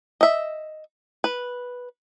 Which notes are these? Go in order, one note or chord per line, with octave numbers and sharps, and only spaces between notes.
D#5 E5
B4